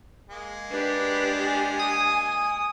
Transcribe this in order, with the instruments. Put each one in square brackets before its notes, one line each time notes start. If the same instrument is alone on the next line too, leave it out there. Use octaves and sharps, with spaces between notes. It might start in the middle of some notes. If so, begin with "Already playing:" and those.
[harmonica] G#3 A#3
[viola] D4 G4 [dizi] B4
[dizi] G#5
[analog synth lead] D#6